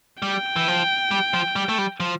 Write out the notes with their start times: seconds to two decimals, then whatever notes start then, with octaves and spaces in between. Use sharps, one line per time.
0.22 G3 G5
0.56 E3
0.68 F3
1.11 G3
1.34 F3
1.56 G3
1.69 A3
1.78 G3
2.00 F3